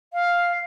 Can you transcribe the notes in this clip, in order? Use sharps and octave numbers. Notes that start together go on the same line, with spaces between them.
F5